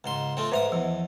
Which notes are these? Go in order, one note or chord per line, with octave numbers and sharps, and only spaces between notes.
C#2 G#2 C6
F3 A3 C4
G#2 B4 C5 E5 F5 D#6
E2 F3